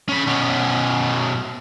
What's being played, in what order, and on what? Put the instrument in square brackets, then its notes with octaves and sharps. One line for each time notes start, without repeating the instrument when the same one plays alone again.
[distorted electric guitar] C#4 B5
B2 C#4